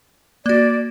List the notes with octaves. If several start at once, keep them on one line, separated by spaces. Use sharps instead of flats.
A#3 F#4 D5